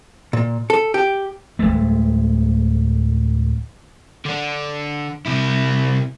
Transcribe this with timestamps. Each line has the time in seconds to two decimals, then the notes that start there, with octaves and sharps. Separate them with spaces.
0.33 A#2
0.70 A4
0.94 G4
1.59 D1 B1 G#3 A3
4.25 D3 D4
5.26 C3 E4